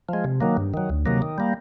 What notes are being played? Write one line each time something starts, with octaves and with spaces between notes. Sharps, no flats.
F3 G#3
C3
D#3 F#3 A#3
G2
D#3 F#3
D2
C3 D#3 F#3 A#3
D#3
G3 A#3